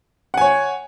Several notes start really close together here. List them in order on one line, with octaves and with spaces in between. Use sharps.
F#5 G#5 C#5